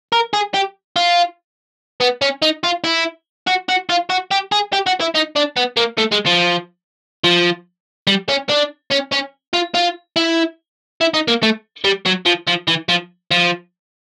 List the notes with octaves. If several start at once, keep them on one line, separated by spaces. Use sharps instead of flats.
A#4
G#4
G4
F4
B3
C#4
D#4
F4
E4
F#4
F#4
F4
F#4
G4
G#4
G4
F#4
E4
D#4
D4
B3
A#3
A3
G#3
F3
F3
G3
C#4
D4
C#4
C#4
F4
F4
E4
E4
D#4
A#3
A3
G3
F#3
F3
F3
E3
F3
F3